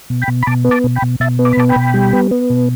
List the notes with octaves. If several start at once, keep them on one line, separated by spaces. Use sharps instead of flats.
B2
G5 B5
B2
B5
B2 A5 D6
B3
A5 D6
B2
G5 B5
B2
B2 E5 A5
B3
D6
B5
B2 A5 D6
G5 B5
B2
G3
B3
B3
B2